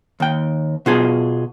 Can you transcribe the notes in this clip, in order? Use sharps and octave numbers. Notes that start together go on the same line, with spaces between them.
D#2 G5
B2 F4 G#4